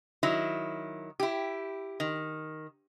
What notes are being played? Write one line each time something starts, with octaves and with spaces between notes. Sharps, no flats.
D#3 F#3 E4
E4 G4
D#3